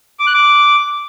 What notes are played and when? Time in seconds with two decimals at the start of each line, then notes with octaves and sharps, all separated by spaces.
0.19 D6
0.27 F#6
0.34 D6